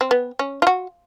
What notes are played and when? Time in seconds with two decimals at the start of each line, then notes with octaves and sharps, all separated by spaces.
0.01 C4
0.11 B3
0.39 C#4
0.62 F4
0.67 F#4